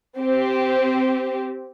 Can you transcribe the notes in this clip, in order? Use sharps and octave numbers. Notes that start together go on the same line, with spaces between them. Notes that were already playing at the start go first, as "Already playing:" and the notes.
C4 G4